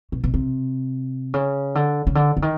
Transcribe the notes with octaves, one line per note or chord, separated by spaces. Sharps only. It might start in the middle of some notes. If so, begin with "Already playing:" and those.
B2
B2
C3
C#3
D3
C#3
D3
D3
D#3